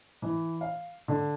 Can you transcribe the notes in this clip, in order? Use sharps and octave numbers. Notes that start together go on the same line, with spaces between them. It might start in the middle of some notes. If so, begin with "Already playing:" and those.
E3
F5
D3